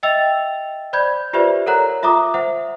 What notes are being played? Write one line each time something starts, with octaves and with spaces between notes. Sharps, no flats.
D#5 E5 G5 E6 A6 F7
C5 D5 B5 G6 G#6
F4 G4 B4 C5 D5 E5
A4 A#4 C#5 F#5 A#5 F#6
F4 E5 A#5 D6 D#6
C5 E5 F#5